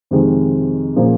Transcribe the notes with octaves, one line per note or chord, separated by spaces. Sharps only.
F2 C3 D#3 G#3 C4
A#2 F3 A#3 C#4 G#4